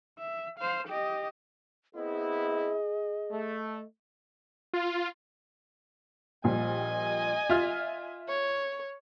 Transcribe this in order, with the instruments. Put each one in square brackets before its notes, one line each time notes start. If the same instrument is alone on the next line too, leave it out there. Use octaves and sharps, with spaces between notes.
[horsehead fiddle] E5
C5 F5
G4 D#5
[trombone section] B3 C4 E4 [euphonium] G#4 [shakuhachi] D#5
[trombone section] A3
[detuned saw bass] F4
[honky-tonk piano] A#1 A#2 G3 [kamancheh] D#5 G#5
[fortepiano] F4 [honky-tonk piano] E5 F6
[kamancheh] C#5